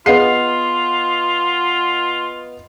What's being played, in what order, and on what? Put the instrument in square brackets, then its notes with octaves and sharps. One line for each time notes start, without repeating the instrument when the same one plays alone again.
[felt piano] B3 D#5 C7 [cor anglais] F4 [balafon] G#4 F5 F#5